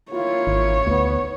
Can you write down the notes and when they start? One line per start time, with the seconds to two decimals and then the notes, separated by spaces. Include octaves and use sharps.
0.12 A#3 E4 F4 C#5
0.47 G#1
0.87 D2 B3